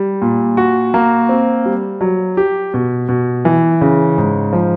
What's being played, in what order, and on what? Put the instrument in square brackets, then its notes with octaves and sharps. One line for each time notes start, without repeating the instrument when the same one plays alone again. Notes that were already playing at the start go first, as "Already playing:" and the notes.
Already playing: [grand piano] G3
A#2
F#4
A#3
C4
G3
F#3
G4
B2
B2
E3
C#3
G#2
F3